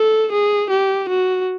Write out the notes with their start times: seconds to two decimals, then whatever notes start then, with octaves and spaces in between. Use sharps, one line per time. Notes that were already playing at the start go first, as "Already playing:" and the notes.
Already playing: A4
0.32 G#4
0.70 G4
1.09 F#4